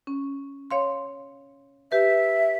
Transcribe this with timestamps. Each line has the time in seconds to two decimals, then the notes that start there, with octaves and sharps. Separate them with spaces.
0.07 C#4
0.71 C#5 F5 C6
1.92 G4 B4 E5